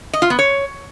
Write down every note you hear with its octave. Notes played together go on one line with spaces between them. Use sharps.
D#5
F4
B3
C#5